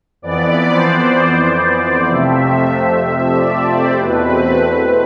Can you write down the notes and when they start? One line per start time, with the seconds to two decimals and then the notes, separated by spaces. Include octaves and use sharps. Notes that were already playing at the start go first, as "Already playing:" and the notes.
0.22 F2 E3 B3 D5
0.69 C5
1.62 D5
2.09 F2 C3 F3 A3 C4 E5
3.02 E5
3.33 D5
3.65 C5
3.96 E2 B2 A3 C4 B4